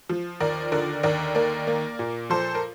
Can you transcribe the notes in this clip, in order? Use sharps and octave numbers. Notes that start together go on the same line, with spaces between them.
F3
D#2 A#4 D5
D3 A#4 D5
D#2 A#4 D5
A#3 A#4 D5
A#3
A#2
F3 A4 C5
A#4